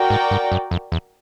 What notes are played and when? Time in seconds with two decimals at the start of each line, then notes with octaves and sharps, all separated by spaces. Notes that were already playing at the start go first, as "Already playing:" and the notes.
Already playing: F#4 A#4 D5 G5
0.10 G#2
0.31 G2
0.52 F#2
0.71 F2
0.92 E2